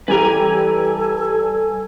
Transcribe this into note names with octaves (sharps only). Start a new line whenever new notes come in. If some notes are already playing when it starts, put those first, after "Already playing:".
E3 G3 G4 A4 B4 G#5 A#5